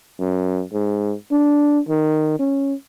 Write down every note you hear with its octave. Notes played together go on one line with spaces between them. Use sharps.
F#2
G#2
D4
D#3
C#4